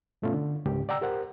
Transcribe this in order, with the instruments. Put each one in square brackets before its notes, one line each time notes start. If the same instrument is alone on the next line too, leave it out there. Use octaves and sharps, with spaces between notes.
[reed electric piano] G2 B2 A3 B3 C#4 F4
D3
C#2 G#2 G4
D5 F#5 G5 A#5 E6
G4 A#4 C5 F#5